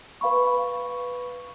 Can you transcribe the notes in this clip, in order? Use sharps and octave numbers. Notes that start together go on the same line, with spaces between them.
B4 F5 B5 C#6